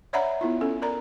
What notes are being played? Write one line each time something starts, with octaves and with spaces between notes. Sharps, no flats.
C#5 D5 E5 F#5 A#5 B5
B3 E4 F4
C#4 A4
A#4 D5 A#5